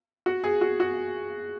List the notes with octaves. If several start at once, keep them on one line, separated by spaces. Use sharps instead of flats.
F#4
G#4
F#4
F#4